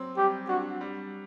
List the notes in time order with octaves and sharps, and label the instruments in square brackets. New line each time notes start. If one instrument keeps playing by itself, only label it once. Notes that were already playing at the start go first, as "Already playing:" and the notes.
Already playing: [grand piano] F#3 C4
[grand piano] G3 [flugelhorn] G4
[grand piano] D4 [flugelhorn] F#4
[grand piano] G3